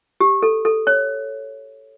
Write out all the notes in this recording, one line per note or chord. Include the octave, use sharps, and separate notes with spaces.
G4
A4
A4
C#5